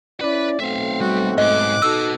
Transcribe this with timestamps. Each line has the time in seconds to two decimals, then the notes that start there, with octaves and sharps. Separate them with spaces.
0.21 C#4 E4 B4 D5 B5
0.60 B1 A3 C4 E5 F5
1.01 G3 F#4
1.38 G#2 D#5 D6 F#6
1.82 B3 D#4 F#4 A4 D#5 E6